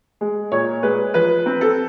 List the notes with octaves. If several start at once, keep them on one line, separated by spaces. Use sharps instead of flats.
G#3
A#2 C#5
G#3 B4
F3 B4
C4
A4